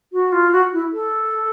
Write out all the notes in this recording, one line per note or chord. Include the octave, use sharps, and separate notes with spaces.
F#4
F4
F#4
E4
A4